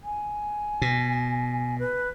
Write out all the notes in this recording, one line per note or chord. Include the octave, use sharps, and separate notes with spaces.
G#5
B2
B4